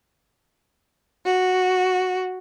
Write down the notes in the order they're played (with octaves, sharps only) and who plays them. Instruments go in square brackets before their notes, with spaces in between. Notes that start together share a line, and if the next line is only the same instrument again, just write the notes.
[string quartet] F#4